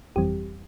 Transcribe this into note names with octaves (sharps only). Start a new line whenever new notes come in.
G1 F2 E3 G3 C4 G4